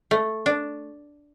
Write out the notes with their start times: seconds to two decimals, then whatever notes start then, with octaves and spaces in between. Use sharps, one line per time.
0.11 A3
0.46 D4